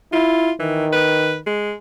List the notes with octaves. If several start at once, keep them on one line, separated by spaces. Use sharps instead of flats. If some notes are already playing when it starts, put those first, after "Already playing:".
E4 F4
D#3 E3
B4
G#3